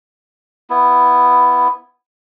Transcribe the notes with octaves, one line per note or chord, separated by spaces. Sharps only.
B3 E4